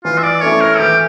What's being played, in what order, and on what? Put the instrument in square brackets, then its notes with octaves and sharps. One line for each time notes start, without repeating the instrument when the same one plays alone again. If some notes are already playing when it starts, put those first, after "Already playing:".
[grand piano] E3 [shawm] F4
[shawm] E5
D5
[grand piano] A3 C#4 E4 [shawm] C#5
[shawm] A#4
[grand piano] E3 [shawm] G4